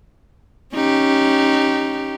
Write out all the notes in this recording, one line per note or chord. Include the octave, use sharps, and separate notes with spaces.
C#4 D#4 G4